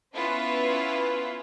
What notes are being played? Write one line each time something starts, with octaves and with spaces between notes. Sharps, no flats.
B3 C#4 E4 F4 B4